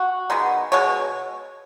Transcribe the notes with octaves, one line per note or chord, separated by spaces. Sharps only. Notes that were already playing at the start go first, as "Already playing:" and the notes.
Already playing: F#4
D#3 G#3 B3
B2 G#3 C#5